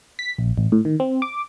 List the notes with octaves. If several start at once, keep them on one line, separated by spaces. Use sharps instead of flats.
B6
A#1
A1
A2
D#3
C4
D6